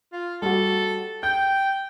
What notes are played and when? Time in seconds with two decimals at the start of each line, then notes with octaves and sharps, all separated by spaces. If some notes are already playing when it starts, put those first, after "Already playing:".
0.12 F4
0.42 G3 F#4 A4
1.23 G5 G6